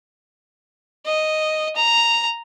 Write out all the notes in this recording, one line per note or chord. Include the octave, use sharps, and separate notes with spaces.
D#5
A#5